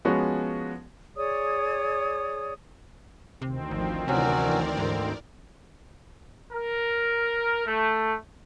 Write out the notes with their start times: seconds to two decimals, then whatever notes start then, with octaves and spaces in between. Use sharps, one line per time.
0.05 F3 G#3 B3 C#4 F#4
1.16 G#4 C#5 D5 D#6
3.42 D2 C3 D#3 C4
3.71 G#1 F3
4.08 C3 E3 F#3 C#4 F#4 A#4 D5
4.77 G#2 D3
6.53 A#4
7.66 A3